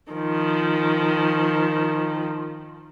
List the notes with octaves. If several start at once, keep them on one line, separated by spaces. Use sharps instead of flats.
D#3 F3